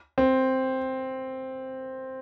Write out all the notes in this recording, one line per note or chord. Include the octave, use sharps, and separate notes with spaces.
C4